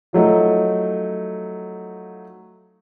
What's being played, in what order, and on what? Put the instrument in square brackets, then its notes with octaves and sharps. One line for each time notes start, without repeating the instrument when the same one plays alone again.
[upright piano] F3 F#3 A3 D#4